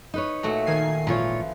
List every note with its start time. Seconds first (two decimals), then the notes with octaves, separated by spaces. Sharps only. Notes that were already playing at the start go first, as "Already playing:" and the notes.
0.14 D#4 B4 C#5
0.43 A#2 A3 F#4
0.66 D#3 G#5 C7
1.07 G#1 A#2 E3 F3 F4 C#5